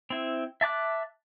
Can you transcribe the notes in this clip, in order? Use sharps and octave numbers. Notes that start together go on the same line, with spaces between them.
C4 E4
E5 A5 D6 F#6